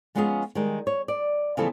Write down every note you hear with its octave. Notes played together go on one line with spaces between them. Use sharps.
F3 G#3 B3 C#4 F4 G#4
D#3 G3 G#3
C#5
D5
C#3 E3 F3 G3 B3 A4